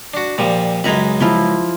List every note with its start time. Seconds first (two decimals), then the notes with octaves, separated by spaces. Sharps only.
0.14 D4 F#4
0.38 A#2 F3 G3
0.84 C#2 F#2 G#3 G#4 A#5 B5
1.20 F3 E4 F4